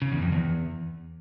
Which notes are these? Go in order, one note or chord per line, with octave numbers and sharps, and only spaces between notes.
C#3
E2
F2
E2